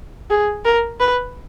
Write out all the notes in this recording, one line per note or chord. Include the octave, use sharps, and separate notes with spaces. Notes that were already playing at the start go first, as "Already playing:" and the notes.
G#4
A#4
B4